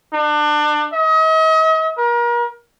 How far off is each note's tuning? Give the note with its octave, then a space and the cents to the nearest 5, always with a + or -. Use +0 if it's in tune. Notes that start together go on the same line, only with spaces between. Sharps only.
D4 +30
D#5 +40
A#4 +35